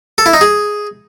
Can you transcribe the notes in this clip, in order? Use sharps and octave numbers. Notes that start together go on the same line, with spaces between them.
A4
E4
D#4
G#4